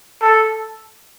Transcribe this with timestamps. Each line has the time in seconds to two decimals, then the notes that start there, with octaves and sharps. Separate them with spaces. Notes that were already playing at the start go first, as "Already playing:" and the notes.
0.21 A4